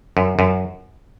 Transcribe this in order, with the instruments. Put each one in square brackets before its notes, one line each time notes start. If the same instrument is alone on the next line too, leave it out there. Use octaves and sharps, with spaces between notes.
[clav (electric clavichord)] F#2
F#2